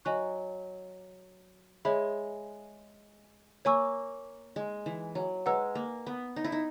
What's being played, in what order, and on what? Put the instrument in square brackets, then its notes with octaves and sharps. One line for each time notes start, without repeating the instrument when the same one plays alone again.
[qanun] F#3 [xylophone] D#5 G#5 C#6 F#6
[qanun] G#3 [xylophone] G#4 C#5 E5 B5
[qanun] A#3 [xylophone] C#5 G#5 C#6 E6
[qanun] G#3
E3
F#3
[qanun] G#3 [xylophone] B4 F#5 A#5 E6
[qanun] A#3
B3
D#4
E4
D#4